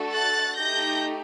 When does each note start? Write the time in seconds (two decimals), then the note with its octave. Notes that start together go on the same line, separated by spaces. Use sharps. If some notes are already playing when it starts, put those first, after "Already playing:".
Already playing: A3 D4 F#4 A4
0.13 F#6 A6
0.58 A3 D#4 G4 G6 A#6